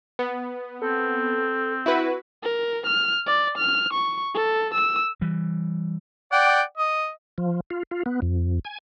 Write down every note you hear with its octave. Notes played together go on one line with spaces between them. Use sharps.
B3
C4 A4
E4 F#4 B4
A#4
F6
D5
F6
C#6
A4
E6
E3 G3
D5 F#5 G5
D#5
F3
F4
F4
B3
F2
G#5